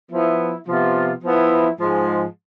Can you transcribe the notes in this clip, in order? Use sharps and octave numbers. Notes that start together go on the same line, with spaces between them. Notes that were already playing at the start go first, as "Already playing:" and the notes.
F3 B3 E4
C3 F3 B3 F4
F3 B3 E4
G#2 F3 G#3